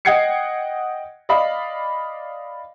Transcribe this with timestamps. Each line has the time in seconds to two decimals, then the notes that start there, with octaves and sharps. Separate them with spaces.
0.05 D#5 F#5 G5 G#6 C7 C#7
1.29 D5 D#5 F5 B5